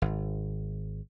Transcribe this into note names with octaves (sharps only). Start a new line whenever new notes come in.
G#1